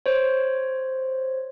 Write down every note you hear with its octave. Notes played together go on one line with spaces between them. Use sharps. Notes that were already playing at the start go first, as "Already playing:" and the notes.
C5 C#5